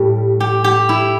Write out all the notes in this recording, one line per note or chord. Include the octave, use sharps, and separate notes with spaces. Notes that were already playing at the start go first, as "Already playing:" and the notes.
Already playing: A2 G3
G4
G4
E4